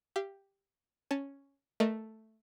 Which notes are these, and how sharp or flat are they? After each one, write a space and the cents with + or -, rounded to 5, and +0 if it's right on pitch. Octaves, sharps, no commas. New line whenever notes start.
G4 +5 F5 -35
C#4 +0 A5 +0
A3 +0 A#4 +0 D#5 -25